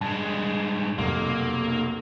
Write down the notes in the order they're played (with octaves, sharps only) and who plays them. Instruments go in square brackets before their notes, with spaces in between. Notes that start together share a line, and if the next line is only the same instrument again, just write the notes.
[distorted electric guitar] G2 G#3 [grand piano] A5
[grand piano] F1 B1 [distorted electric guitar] A#3